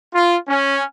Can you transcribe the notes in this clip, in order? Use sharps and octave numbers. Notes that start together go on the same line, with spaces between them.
F4
C#4